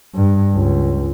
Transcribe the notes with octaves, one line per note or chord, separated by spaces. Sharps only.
G2
C#2